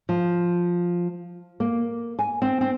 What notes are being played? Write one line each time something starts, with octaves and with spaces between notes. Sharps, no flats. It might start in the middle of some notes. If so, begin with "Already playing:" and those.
F3
A#3
G#5
C4
C4